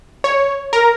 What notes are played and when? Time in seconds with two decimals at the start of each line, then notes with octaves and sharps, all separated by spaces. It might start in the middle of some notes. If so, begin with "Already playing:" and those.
0.24 C#5
0.73 A#4